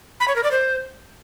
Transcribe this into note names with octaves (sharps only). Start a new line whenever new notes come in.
B5
C#5
A#4
D5
C5